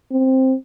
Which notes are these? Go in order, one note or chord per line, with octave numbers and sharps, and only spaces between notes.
C4